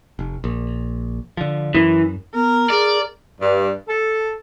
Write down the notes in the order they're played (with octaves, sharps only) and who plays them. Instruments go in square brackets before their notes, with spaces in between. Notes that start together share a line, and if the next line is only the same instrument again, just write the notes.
[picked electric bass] F1
A#1
D3 F3
[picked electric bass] F#2 [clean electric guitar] E3
[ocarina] B3 [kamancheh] A#4
[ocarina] G#4 [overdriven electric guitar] D5
[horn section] G2
A4